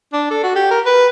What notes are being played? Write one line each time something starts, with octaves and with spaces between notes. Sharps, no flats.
D4
A4
F#4
G4
A#4
B4